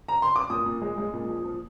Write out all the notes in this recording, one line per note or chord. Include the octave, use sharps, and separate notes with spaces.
A#5
C6
D6
A#2 D#6
A#2
G#3
G#3
A#2
F3
F3